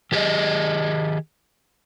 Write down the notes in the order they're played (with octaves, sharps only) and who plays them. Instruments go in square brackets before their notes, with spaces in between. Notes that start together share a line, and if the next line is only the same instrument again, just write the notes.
[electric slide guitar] D#3 G4 G#4 D5 D#5